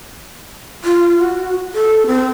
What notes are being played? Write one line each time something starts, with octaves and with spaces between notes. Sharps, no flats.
F4
F#4
A4
C4